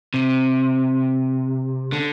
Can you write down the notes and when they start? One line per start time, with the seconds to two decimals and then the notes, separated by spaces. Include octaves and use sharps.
0.14 C3
1.92 D3